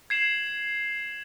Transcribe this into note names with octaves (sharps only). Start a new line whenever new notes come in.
G#6 C7 E7 F#7